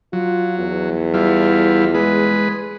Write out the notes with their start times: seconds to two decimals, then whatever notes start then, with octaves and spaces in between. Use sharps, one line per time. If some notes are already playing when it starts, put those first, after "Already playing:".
0.13 F#3 F4
0.58 E2
1.14 G3 E4 F4
1.94 G#3 B4